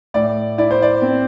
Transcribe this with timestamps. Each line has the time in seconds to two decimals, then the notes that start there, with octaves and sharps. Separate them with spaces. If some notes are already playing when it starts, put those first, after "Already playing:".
0.14 A2 D5
0.58 E4 D5
0.71 C5
0.82 D5
1.02 C4